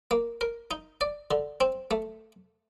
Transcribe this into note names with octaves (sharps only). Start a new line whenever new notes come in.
A#3
A#4
D#4
D5
D3
C4
A3